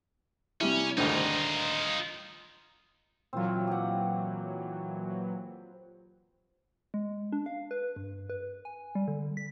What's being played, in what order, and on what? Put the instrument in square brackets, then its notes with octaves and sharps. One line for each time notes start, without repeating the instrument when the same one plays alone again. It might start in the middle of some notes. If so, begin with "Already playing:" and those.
[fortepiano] C3 G3 E4 [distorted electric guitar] C#4
[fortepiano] G#1 D2 [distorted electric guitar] D#4 F4
[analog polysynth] A#2 E3 F#3 [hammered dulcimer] C4 F4
[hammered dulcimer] G4 F#5
[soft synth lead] G#3
D4
F5
B4
G2
B4
G#5
G3
D3
B6